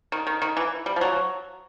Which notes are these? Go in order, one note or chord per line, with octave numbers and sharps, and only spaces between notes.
D#3
D#3
D#3
E3
G3
F3
F#3